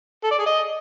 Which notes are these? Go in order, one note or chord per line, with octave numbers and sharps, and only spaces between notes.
A4
D5
G#4
D#5